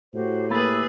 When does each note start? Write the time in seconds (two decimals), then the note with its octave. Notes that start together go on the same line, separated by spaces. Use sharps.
0.14 A2 F#4 G4 C5
0.50 A#3 G4 G#4 B4 E5 B5 E6 A6